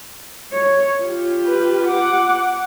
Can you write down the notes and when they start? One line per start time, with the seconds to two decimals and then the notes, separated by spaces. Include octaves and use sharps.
0.52 C#5
1.02 F4 G4
1.46 B4
1.87 F#5 D6